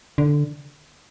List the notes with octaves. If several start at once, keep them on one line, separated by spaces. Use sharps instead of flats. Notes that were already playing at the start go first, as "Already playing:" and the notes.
D3